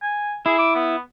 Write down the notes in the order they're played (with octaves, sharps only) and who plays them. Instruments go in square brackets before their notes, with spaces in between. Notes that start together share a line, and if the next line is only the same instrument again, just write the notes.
[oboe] G#5
[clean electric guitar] E4 [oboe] G#4
[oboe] D6
B3